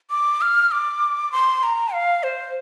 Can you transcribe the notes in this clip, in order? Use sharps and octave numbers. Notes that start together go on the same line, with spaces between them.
D6
F6
D6
C6
A#5
F5
C5